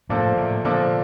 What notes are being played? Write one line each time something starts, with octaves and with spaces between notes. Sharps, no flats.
A2 C3 F3 A#3 D4 A4
A2 C3
A#2 D3 F3 A#3 D4 A4